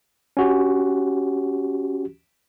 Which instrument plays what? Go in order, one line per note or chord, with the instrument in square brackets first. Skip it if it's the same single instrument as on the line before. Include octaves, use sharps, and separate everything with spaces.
[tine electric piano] C#4 F#4 G4